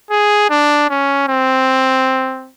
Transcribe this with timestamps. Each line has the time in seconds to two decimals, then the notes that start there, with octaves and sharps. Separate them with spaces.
0.11 G#4
0.50 D4
0.90 C#4
1.29 C4